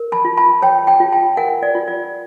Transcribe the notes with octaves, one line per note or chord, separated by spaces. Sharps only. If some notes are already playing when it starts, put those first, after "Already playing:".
Already playing: A#4
A5 B5
F4
A5 B5
C#5 G5 A5
G5 A5
F4
G5 A5
A#4 F#5 G#5
D5
F4
D5